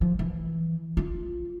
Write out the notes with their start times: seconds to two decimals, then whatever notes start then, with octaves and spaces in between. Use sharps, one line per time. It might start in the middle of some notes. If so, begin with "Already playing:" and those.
0.01 F3
0.19 E3
0.97 F4